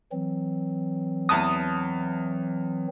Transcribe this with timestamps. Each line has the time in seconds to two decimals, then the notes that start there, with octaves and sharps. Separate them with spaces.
0.12 E3 F#3 C4
1.29 E2 A5 D#6